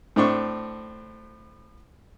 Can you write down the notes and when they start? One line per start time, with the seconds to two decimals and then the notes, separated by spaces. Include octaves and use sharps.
0.16 A2 C4 D4 C#6